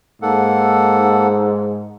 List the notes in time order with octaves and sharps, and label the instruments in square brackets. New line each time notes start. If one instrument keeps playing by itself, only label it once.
[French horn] G#2 [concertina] A#3 A4 F#5